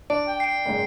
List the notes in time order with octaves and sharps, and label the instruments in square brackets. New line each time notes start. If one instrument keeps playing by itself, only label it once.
[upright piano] D4 [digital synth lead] D5 [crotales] D7
[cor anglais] G5
[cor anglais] G5 [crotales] C7 D7
[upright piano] F#1 G#2